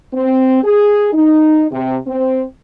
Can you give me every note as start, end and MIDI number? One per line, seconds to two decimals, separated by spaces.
0.14 0.60 60
0.63 1.10 68
1.13 1.65 63
1.71 1.96 48
2.07 2.42 60